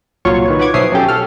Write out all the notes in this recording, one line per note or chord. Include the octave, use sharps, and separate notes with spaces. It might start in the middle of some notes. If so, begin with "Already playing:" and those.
C2 A#2 F#3 F4 C#5 C#6
D#3 B4 C#5
B4 C#5 F#5 D6 G#6
B1 F3 C#5 E5 D#6 C7
F#3 C#4 G4 A4
A4 F6